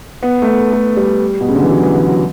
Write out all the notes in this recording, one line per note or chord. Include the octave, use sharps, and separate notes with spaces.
B3
A3
B3
A3
G3
B2
C#3
D3
E3
F#3
E3
E3
F#3